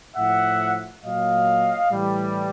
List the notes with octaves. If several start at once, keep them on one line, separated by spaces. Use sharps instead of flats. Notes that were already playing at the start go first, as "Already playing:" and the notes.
A2 F3 E5 F#5
A#2 F#3 D#5 F5
A2 E3 G3